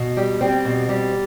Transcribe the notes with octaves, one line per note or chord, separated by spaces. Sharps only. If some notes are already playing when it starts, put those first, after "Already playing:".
Already playing: B2
G3
G3 C4
B2
G3